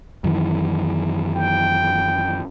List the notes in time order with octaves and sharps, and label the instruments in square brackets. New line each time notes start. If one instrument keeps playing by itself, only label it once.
[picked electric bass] F#2 D#3 E3
[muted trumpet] G5